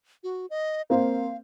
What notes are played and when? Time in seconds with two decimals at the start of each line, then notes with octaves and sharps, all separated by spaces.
0.24 F#4
0.50 D#5
0.90 A#3 C4 F5